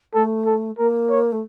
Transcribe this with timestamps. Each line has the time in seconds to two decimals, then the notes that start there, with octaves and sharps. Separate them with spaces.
0.14 A3 A4
0.46 A4
0.78 A#3 A#4
1.10 C#5
1.32 A3